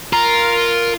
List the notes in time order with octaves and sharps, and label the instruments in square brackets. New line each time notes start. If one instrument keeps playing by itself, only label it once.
[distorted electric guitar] F4 [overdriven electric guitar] A#4